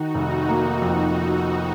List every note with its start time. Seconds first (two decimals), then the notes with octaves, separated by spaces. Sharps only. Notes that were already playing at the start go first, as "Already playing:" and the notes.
Already playing: D#3 D#4 F#4
0.14 F1
0.49 A#3
0.82 F2